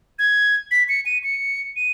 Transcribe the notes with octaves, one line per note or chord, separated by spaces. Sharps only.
G#6
B6
C#7
D#7
C#7
D#7